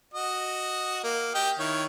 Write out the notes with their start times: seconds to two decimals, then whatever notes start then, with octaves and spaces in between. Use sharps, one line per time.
0.14 F#4 D#5
1.03 A#3
1.34 G4 D#5 G5
1.59 D#3 E4 C#5